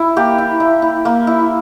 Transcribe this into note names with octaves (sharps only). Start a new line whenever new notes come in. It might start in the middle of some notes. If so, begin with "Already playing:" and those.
Already playing: E4
A#3 G4
E4
E4
E4
A#3
E4